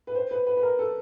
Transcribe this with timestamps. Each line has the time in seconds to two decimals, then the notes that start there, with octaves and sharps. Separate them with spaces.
0.07 B4
0.15 C5
0.31 B4
0.47 B4
0.57 B4
0.63 A#4
0.79 A4